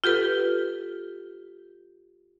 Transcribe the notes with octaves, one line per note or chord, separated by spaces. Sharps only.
F4 G4 A4 B4